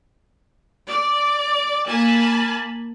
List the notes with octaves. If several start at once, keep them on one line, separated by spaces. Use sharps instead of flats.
D5
A#3 G#5 A5 B5